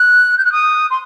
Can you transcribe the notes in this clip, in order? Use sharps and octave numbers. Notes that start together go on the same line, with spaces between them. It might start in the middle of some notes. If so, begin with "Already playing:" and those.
Already playing: F#6
G6
F#6
D#6
C6